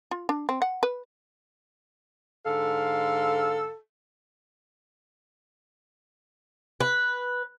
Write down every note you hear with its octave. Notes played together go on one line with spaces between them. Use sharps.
F4
D4
C4
F#5
B4
G#2 D3 A4 F5
B4